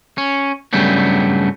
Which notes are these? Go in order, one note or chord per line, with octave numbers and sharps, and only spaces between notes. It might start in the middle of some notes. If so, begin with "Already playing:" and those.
C#4
G2 C#3 F#3 G3 A3 B3